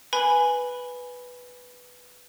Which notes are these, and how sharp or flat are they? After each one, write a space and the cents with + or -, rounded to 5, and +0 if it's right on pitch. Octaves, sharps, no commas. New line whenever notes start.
B4 +0 G#5 +0 B5 +0